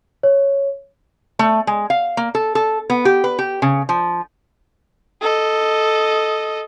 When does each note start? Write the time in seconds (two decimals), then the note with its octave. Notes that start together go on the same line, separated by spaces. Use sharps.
0.23 C#5
1.39 A3
1.67 G#3
1.90 F5
2.17 A#3
2.35 A4
2.55 A4
2.90 B3
3.05 G4
3.24 B4
3.39 G4
3.62 C#3
3.89 F3
5.21 A4 D#5